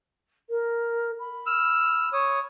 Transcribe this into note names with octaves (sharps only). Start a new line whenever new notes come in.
A#4
B5
E6 F6
C#5 D#6